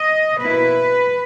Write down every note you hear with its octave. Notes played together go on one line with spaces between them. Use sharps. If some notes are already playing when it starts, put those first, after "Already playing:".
Already playing: D#5
B2 A#3 E4 B4